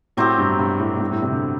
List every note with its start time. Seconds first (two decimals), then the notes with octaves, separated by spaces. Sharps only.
0.17 A2 F#3 C4 G4
0.38 G2
0.59 G2
0.79 A2
0.96 A2
1.01 G2
1.11 A2
1.22 C3
1.32 D3